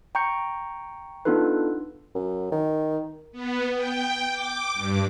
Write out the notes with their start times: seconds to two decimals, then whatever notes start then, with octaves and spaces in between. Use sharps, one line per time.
0.15 G5 A#5 C#6 G6 C#7
1.25 B3 D4 D#4 F4 A4 B4
2.15 F#2
2.52 D#3
3.32 B3
3.75 G5
4.30 D6
4.74 G2